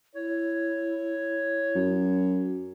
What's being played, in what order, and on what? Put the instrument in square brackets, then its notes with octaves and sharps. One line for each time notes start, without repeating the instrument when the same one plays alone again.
[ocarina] E4 [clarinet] C#5
[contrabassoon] F#2